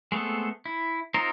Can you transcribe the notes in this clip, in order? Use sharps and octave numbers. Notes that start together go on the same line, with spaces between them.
G#3 A3 B3 C4 A4
E4
C4 D#4 F4 A#4 C5